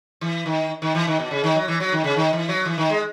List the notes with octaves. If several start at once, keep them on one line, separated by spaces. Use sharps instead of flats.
E3
D#3
D#3
E3
D#3
B2
C#3
D#3
F#3
E3
F#3
D#3
C#3
D#3
E3
F#3
E3
D#3
G#3